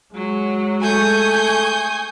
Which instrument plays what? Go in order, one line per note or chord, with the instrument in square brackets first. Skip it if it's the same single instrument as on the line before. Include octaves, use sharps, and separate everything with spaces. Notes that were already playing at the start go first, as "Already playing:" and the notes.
[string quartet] F#3 [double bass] G#3
[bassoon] A3 [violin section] G#5 [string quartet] C#6 D#6 G6